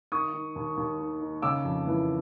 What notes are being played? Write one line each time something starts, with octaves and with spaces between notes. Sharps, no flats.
D#3 C#6 D#6
D#3
D#2
D#2
D#3
D#3
C#3 D6 E6
F2
E3